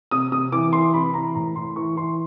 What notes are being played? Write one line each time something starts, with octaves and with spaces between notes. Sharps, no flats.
C3 D#6
C3 D#6
E3 D6
E3 C6
C3 B5
E3 A#5
A2 A#5
A2 C6
E3 C#6
E3 C6